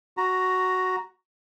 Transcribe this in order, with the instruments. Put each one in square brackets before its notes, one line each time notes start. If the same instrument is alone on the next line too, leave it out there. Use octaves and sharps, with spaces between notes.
[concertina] F#4 A#5